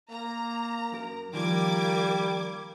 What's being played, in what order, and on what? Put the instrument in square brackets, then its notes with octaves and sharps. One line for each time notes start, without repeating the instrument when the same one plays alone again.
[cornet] A#3 [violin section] A#5
[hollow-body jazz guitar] F#2 A#4
[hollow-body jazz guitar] D#3 F3 [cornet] G3 [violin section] A#3 D6 G#6